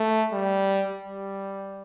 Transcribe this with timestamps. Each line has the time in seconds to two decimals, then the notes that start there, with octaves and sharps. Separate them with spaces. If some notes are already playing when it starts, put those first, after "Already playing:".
Already playing: A3
0.33 G3
0.91 G3